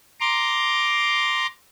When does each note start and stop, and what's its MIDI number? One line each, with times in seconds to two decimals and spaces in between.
0.20 1.47 82
0.20 1.47 84
0.20 1.47 86